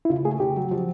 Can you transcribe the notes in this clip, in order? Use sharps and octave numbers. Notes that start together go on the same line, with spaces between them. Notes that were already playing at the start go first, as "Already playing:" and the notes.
E4
C#3 F4
A3 G#4
C#3 G4
F#3
F3